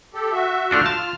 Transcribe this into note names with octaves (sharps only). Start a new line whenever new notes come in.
G4 A4
F#4 E5
A3 D4 F4 F#4 F6
A5